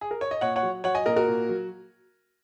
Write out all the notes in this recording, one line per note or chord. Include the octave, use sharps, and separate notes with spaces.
G#4
A#4
C#5
D#5
A#2 C#5 F#5
C#5 F#5
F#3
F#3 C#5 F#5
D#5 G#5
A#2 A#4 D#5
F#4 A#4
A#2
F#3